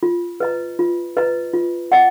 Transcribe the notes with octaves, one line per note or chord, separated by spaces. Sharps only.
F4
B4 D#5 A#5
F4
B4 D#5 A#5
F4
D#5 F#5